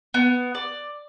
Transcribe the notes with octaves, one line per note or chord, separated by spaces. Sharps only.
B3
D5